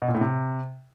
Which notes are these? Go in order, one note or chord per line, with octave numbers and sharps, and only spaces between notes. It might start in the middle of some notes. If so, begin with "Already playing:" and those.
B2
A#2
A2
C3